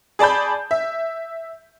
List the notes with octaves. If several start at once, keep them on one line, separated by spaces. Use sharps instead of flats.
G#4 D5 A5 B5 G6
E5